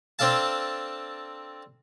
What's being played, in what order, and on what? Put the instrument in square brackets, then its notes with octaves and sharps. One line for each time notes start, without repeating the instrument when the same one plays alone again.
[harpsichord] C4 D4 A4 F5 A5